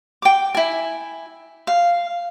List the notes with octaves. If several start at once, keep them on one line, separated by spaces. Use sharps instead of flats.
G5 D6
E4 G#5
F5